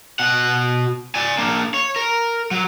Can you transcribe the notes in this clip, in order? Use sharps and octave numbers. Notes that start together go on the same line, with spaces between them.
B2 F#5
D5 G#5
A#3 D4
C#5
A#4
F#3